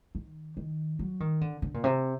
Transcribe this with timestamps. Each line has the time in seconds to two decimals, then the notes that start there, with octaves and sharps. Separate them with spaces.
0.15 D#3
0.57 D#3
0.99 F#3
1.20 D#3
1.41 D3
1.62 D3
1.74 A#2
1.84 C3